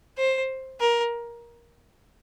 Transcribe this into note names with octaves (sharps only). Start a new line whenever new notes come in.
C5
A#4